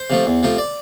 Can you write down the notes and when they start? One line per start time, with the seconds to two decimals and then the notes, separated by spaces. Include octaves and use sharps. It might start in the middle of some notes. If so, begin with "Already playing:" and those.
Already playing: C5
0.10 C3 F3 A3
0.26 E2
0.43 C3 F3 A3
0.58 D5